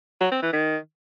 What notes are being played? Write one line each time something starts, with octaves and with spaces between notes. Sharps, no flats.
F#3
C4
E3
D#3